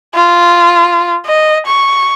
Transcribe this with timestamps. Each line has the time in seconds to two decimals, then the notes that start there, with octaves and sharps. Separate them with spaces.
0.14 F4
1.26 D#5
1.66 C#6